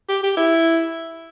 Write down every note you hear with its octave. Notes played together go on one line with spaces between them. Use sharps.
G4
G4
E4